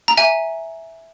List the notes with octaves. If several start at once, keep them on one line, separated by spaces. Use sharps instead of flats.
A#5
E5 G#5